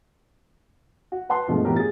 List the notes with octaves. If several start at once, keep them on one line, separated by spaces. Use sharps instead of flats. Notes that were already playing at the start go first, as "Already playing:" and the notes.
F#4
B4 F#5 A5 C6
G2 B2 F3 G#3 A3
A2 F3 B3 G4 A#4
G#4 A6